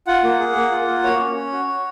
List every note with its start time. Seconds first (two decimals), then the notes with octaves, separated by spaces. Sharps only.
0.07 F4 F#5
0.24 A#3
0.40 G#4
0.56 A#3
0.71 F4
0.88 A#3
1.04 F#4 C#5
1.20 C#4
1.36 C#4
1.52 F#4
1.68 F#4